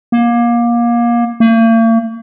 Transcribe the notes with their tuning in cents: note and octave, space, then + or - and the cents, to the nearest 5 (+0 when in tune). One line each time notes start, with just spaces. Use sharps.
A#3 +25
A#3 -45